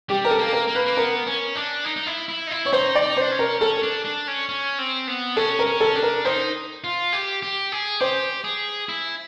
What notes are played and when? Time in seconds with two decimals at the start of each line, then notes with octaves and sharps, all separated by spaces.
0.09 G3 G4
0.25 A#4
0.31 A4
0.39 A#3
0.53 A#4
0.67 A#3
0.75 B4
0.86 A#3
0.97 B3 A#4
1.27 C#4
1.56 D4
1.85 D#4
1.96 D#4
2.07 E4
2.28 E4
2.47 D#4
2.51 E4
2.65 C#5
2.73 D#4 C5
2.95 D5
3.02 D#4
3.17 D4 C5
3.32 C#4
3.39 A#4
3.61 C#4 A4
3.83 D4
4.05 D4
4.28 C#4
4.49 C#4
4.79 C4
5.07 B3
5.36 C#4 A4
5.59 A#4
5.66 C#4
5.80 A4
5.95 D4
6.03 A#4
6.25 D#4 C5
6.84 F4
7.13 G4
7.43 G4
7.72 G#4
8.00 G4 C5
8.44 G#4
8.89 E4